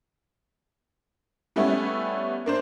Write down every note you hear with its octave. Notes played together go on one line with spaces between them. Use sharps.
G3 A3 B3 C#4 E4
A#3 D4 C5